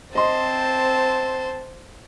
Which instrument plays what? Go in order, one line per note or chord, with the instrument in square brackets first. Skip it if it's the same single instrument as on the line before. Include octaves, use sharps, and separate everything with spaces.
[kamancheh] C4 A5 [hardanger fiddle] C5 [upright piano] D#5 C6